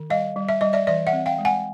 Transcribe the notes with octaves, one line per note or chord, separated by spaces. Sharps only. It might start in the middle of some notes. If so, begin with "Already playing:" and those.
Already playing: D#3
G3 D#5 F5
G3
E5
G3 D#5
D5 E5
E3 D5 E5
E5 F#5
C4
F5 G5
G#3
F#5 G#5